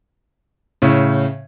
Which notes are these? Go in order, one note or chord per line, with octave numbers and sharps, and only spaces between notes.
A2 C#3